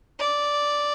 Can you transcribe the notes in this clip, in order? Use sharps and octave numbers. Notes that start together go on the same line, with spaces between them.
D5